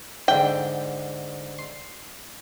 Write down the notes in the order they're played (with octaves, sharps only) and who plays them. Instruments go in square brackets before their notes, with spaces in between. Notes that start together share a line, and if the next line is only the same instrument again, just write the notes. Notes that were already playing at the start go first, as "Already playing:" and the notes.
[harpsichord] G#2 D3 [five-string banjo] G5
[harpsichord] C6